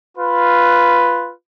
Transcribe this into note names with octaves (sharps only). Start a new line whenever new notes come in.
F4 B4